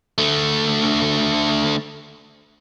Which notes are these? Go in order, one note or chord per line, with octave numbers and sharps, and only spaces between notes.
D3 A3